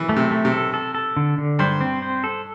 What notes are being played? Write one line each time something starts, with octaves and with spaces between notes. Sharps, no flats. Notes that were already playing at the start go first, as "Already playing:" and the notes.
Already playing: E3
A3
C3
A3
C3
A4
A4
A4
D3
D3
G2 C5
C4
C5
A4